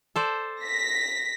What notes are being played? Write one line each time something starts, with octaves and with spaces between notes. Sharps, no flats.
A4 C5 D5
A#6 B6